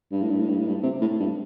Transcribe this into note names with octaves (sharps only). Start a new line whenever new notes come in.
G2
A2
G2
A2
G2
A2
G2
C3
A2
G2